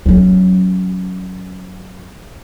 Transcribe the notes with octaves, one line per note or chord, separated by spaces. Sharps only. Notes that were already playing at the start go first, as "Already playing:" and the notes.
F#3 C#4